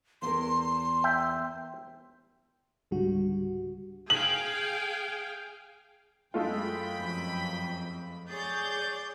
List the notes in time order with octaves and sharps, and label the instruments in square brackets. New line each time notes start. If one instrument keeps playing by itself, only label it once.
[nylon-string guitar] E2 A#4 [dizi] C6
[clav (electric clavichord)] E5 G5
[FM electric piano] C#2 G#2 D3 G3 F#4
[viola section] G#4 F5 G5 [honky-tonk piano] F#7
[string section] F#2 G5 B5 [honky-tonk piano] G#3 A3 F4
[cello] F2
[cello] G#4 C#5 [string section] D5 G6 A6